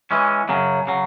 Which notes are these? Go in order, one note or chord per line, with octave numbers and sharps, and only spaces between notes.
E3 G#3 C#4
F#2 C#3 F#3
C#3 F#3